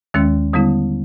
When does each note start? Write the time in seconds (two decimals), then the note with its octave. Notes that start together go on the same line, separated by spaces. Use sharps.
0.14 D#2 D#3 G#3 C#4
0.53 D3 G3 B3 E4